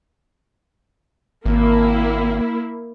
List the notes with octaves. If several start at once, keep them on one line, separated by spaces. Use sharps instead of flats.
G#1 A#3 E4